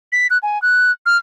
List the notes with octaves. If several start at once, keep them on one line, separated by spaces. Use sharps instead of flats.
B6
F#6
G#5
F#6
F6